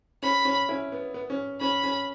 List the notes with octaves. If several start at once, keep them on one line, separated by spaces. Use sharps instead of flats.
C#4 B5
C#4
C#4 E4
B3
B3
C#4
C#4 B5
C#4